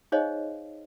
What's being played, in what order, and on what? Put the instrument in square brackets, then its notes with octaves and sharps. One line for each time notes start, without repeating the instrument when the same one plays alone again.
[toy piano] D#4 G#4 C5 C#5 D#5 F5